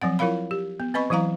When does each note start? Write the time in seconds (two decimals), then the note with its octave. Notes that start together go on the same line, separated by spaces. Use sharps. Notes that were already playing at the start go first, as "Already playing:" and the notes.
0.02 F3 F#3 C4 F#5
0.19 E4 F4 A#4 C#5 F5 B5
0.51 G4
0.80 B3
0.94 C4 B4 D#5 B5 C#6
1.10 E3 F#3 E4 F5 A#5